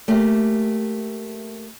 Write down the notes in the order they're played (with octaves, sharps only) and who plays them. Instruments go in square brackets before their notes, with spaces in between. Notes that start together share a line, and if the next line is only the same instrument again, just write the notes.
[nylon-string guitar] A3 A#3 G4